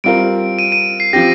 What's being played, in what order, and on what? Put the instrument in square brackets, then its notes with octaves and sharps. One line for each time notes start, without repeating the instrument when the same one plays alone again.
[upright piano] G3 C4 F4 A#4 [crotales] D7
[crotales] D#7
D#7
C7
[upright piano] F3 C4 G4 [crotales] A#6